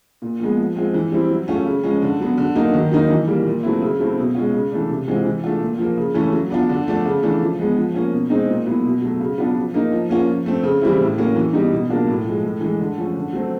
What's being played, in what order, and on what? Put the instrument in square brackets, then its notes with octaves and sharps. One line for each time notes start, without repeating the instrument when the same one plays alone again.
[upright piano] A#2
F3 G#3 B3
F3
G#3 C4 F4
E3
G3 C4 E4
F#3
A3 C#4 F4
C#3
F3 G#3 C#4
D3
F#3 B3
D3
F#3 A#3 D#4
D#3
F#3 A#3 D#4
E3
G3 A#3
A#2
F#3 A3 C4 E4
C#3
F#3 A3 C4 E4
B2
G#3 C#4 F4
C#3
E3 A3 D4
C3
E3 G#3 C4 F4
E3
A3 D4 F4
A#2
F3 A#3
C#3
E3 A3 C#4
F#3
B3 D4 F4
D3
F3 A3 D4
C#3
E3 A3 D4
F3
G#3 B3
F3
A#3 C#4 F4
B2
G#3 C4 D#4
A#2
F#3 B3 E4
B2
F#3 A3
C#3
F#3 B3 D4 F4
F3
A#3 D#4
F3
A#3 C#4 F4
F3
A3 C4
C#3
E3 G3 C4 E4
A2
F#3 A#3 C#4
E3
G3 B3 D#4
B2
F#3 A#3 D4 F4
A2
F3 G#3
A2
E3 G#3
D3
F3 A3 C#4
D3
F#3 A3 C4